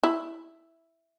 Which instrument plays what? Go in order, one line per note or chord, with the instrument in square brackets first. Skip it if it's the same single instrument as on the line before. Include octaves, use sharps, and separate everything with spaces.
[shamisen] E4